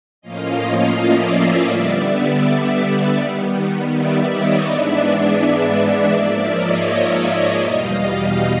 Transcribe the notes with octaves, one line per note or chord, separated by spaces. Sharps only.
A2 F3 A#3 C#4 F4 D#5 F5
D5 E5
D3 G3 B3
D#3 G3 B3
D5 E5
C#5 D#5
G#2 E3 G#3 B3 D4 D5 E5
G#2 F3 A#3 D5 E5
C#5 D#5
E2 B2 G3 D#5 F5